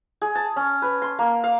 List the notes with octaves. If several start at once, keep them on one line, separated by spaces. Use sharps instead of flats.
G#4
A5
C#4
B4
C6
A#3
F5